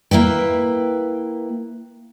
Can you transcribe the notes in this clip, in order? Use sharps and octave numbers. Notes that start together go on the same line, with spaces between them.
A#3 E4 B4 G5